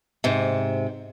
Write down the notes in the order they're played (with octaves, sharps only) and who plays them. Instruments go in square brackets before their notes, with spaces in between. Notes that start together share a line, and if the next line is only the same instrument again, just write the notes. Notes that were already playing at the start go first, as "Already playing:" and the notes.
[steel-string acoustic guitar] G#2 C3